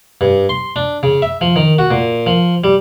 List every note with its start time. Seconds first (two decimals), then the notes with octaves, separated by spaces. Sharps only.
0.21 G2
0.49 C6
0.76 D4
1.03 C#3
1.22 E5
1.41 F3
1.56 D#3
1.79 F#4
1.91 A#2
2.27 F3
2.64 G3